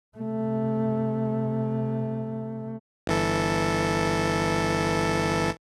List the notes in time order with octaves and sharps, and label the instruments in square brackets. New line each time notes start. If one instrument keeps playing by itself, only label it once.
[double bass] C3 A3
[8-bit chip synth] G1 E3 A4